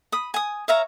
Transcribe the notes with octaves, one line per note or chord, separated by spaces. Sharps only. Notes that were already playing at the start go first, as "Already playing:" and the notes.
B5 D#6
G#5 D#6
C#5 E5 F5 A#5